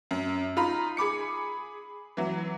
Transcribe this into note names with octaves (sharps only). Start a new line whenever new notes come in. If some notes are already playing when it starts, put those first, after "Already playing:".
F#2
D#4 F4 A#5 B5
G#4 B5 D6 C#7
E3 F#3